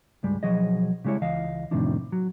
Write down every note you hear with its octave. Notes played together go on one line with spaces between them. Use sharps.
C#2 G2 G3 G#3
B1 F3 F#3 G#4 D#5
C#3 G3 G#3 E4 C#5
C#2 E3 D#5 F5
F2 A2 C3 D#3 F3 D4
F#3